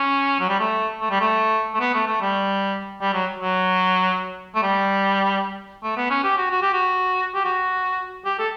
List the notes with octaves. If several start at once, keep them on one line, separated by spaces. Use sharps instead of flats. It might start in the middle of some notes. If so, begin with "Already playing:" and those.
Already playing: C#4
F#3
G3
A3
A3
G3
A3
A3
B3
A3
A3
G3
G3
F#3
F#3
A3
G3
A3
B3
C#4
G4
F#4
F#4
G4
F#4
G4
F#4
G4
A4